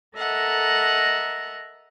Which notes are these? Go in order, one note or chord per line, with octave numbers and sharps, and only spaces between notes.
A4 A#4 D#5 E5 F#5 A#5